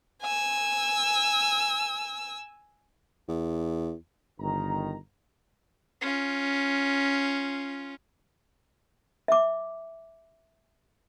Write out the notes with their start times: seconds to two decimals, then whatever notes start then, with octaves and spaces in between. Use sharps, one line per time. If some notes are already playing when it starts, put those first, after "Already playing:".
0.22 G#5 E6
3.28 E2
4.39 G1 D#3 A#5
6.01 C#4 F4
9.28 E5 D6